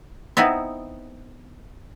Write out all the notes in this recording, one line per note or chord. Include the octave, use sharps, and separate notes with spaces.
B3 C4 D#4 E4